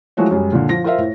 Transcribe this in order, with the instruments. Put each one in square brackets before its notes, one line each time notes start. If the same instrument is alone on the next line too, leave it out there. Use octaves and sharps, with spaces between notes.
[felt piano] E3 F3 G#3 A3 F#4 C#5
F#2 G3 G#3
A#2 D3
F3 A#6
F4 A#4 C5 E5 F5
A2